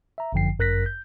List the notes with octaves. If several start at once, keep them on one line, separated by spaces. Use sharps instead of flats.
E5 A#5
G1 F#2 D3 F3 G5 C7
G1 F#2 A#4 F#6 A#6 B6
G6